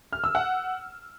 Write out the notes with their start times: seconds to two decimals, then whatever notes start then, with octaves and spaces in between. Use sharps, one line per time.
0.13 F6
0.24 E6
0.35 F#5